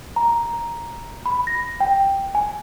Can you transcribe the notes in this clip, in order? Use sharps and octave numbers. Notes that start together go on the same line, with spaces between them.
A#5
B5
A#6
G5
G#5